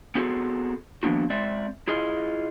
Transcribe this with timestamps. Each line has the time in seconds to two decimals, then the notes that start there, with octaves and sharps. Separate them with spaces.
0.15 B3 C4 F#4 G#4 A4
1.03 D#3 F3 A#3 B3 D4 F#4
1.30 G#3 C4 D5 E5
1.88 E4 F4 G#4 D#5